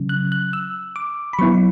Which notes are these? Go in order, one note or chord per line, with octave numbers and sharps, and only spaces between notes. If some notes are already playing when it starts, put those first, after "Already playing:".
Already playing: C#3 F#3 C#4
F#6
F#6
E6
D6
B5
F#3 B3 E4 C#6